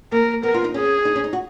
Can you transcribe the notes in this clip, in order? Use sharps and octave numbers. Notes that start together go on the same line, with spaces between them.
A#3 A#4
B3 A#4
F4
D#4
C#4 G#4
D#4
C#4
D#4
F#4